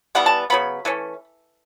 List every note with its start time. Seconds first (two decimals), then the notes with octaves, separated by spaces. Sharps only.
0.15 E3 G3 B3 F#5
0.26 A5
0.50 C#3 F#3 B3 B5
0.85 E3 A3 C#4